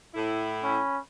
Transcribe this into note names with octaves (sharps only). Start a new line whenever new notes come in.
A2 E4
C#4 B5